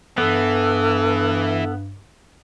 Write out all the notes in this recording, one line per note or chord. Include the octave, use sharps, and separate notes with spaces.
G2 E3 B3 A4